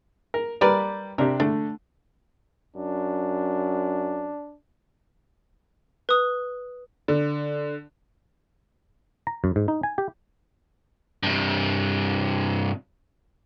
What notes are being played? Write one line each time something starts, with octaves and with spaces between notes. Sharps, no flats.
A#4
G3 A#4 B4 D5
C3 D4 G4 A#4
D3 A3 D4
F#2 D4
B4 D#6
D3
A#5
F#2
G#2
D#4
G#5
G4
G2 C3